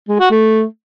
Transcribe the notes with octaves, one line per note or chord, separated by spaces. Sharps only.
G#3
F#4
A3